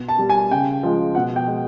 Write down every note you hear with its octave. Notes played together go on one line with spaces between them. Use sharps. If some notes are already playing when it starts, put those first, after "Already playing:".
Already playing: B2
A5
G3
G#5
C#3 G5
F3 G#3
B2 F#5
G5
G#3